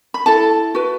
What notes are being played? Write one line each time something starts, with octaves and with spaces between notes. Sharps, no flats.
B5
E4 A4 A5
F#4 B4